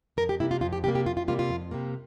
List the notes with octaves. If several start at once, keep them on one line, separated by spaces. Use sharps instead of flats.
F2 A#4
G4
C3 G3 A#3 E4
F4
F2 F4
G4
C3 G3 A#3 G4
G4
F2 F4
F4
C3 G3 A#3 F4
F4
F2
C3 G3 A#3